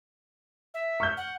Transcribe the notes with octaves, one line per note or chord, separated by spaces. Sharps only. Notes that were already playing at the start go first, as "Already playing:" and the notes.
E5
C#6 F6 G6
F#5